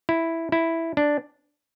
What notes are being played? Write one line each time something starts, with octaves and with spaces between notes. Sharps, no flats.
E4
E4
D4